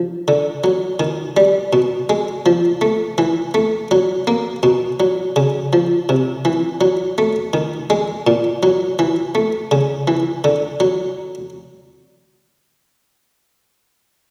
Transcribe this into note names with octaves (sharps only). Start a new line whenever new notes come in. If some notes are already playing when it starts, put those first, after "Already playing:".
Already playing: F3
D3
F#3
D#3
G3
B2
G#3
F3
A3
E3
A3
F#3
A#3
B2
F#3
C#3
F3
C3
E3
F#3
A3
D#3
G#3
A#2
F#3
E3
A3
C#3
E3
D3
F#3